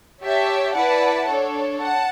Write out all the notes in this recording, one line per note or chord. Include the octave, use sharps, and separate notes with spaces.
G4 C#5 E5 A5
E4 B4 D5 F#5 A5
D4 A4 C#5
F#5 A5